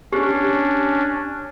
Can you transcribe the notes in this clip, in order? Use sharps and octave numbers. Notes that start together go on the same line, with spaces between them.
C#4 D4 G4